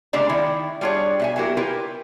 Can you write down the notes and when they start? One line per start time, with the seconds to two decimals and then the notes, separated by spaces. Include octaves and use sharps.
0.13 C#3 G#3 A3 D4 D5 A#5
0.29 D#3 E4
0.81 G3 D4 F4 G#4 C#5
1.20 B2 E5 G#5
1.36 F#3 A#3 E4 G4 A#4
1.57 E4 F4 G4 A#4 B4